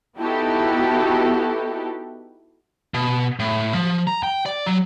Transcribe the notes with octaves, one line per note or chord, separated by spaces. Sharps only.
B3 D#4 E4 F#4 G4 A4
B2
A2
F3
A#5
G5
D5
F#3